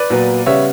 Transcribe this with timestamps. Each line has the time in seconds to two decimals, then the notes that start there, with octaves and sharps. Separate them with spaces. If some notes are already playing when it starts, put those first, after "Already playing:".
Already playing: B4 D5
0.10 A#2 F#3 B3
0.46 C#3 G3 B3 C#5 E5